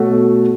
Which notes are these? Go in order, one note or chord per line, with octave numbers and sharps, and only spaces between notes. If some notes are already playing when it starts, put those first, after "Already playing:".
Already playing: B2 A3 F#4 A4 C#5